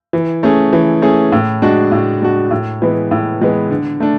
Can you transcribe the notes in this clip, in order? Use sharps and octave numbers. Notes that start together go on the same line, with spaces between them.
E3
A3 C#4 G#4
E3
A3 C#4 G#4
A2
G#3 D4 F#4
A2
G#3 D4 F#4
A2
E3 G#3 B3
A2
E3 G#3 B3
D3
A3 D4